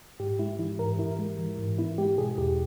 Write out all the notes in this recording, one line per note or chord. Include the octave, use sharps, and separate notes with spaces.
G#2 G4
G#3 E4
E3 E4
G#2 A#4
G#2 E4
G#3
E3
G#2
B3 E4
G#3 G4
B2 G#4
E2 G4